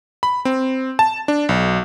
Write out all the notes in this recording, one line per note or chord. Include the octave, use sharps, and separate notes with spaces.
B5
C4
A5
D4
B1